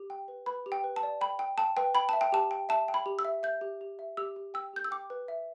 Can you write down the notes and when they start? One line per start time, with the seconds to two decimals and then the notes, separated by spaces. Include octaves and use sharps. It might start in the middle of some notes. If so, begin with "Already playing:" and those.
Already playing: G4
0.10 G5
0.28 B4
0.46 B4 B5
0.66 G4
0.72 G5
0.84 B4
0.96 A5
1.03 D5
1.21 G5 B5
1.39 G5
1.58 G5 A5
1.77 B4 G5
1.95 G5 B5
2.09 E5 A5
2.21 G5
2.32 G4 A5
2.51 G5
2.69 E5 A5
2.88 G5
2.94 B5
3.06 G4
3.19 E6
3.25 E5
3.43 E5 G6
3.61 G4
3.81 G4
3.99 E5
4.17 G4 E6
4.36 G4
4.54 G5 E6
4.73 G4 G6
4.84 E6
4.91 G5 D6
5.10 B4
5.28 E5